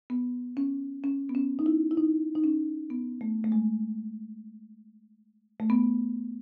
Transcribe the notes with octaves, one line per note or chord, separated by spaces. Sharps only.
B3
C#4
C#4
B3
C#4
D#4
E4
E4
D#4
D#4
C#4
B3
A3
A3
G#3
A3
B3